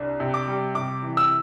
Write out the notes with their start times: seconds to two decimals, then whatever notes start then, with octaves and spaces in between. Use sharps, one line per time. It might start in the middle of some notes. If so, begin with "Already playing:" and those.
Already playing: C2 D4
0.20 C3
0.34 D6
0.48 G3
0.75 C3 D6
1.03 E3
1.17 E6